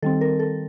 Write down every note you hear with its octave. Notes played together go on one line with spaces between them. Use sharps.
D#3 G3 C4 A4
A#4
A4